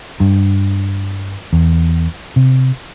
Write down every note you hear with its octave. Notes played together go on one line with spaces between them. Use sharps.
G2
E2
C3